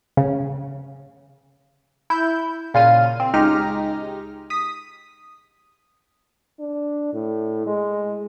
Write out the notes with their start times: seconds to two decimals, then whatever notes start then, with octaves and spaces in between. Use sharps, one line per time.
0.17 C#3
2.10 E4 G6
2.74 A#2 C#3 F4 F6 D#7
3.20 C4
3.34 C#2 G#3 D#4 G4 F6 A#6
4.50 D#6 B6
6.60 D4
7.13 A2
7.67 G#3